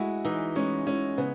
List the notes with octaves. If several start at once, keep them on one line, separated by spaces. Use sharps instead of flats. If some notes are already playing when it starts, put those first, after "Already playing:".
Already playing: G#3 E4 F#4
E3 D#4
G#3 C#4
G#3 C#4
C#3 B3